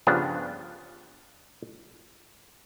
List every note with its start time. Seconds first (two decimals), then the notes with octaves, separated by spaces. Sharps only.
0.07 G2 C#3 F3 B3 D4 G4